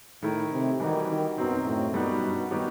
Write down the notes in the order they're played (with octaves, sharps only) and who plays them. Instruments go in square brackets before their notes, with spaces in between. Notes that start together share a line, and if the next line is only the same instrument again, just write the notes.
[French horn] A2 [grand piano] D#3 A3 E4
[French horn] C3
[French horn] D#3 [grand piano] E3 G3 D#4 F#4
[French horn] D#3
[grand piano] F#2 F#3 C4 D#4 [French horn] B2
[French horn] A2
[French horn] F#2 [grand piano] B2 G3 B3 D#4 F#4
[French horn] G2
[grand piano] D#3 F#3 B3 D#4 G4